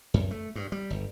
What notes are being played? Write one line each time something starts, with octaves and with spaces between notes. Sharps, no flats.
F#2
A3
G2
G3
G1